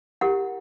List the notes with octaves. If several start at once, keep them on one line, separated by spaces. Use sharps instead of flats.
E4 G4 A#4 F#5